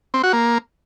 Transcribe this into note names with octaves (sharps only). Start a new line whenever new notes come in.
C4
F#4
A#3